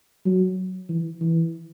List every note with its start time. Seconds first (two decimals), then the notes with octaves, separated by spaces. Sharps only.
0.25 F#3
0.89 E3
1.21 E3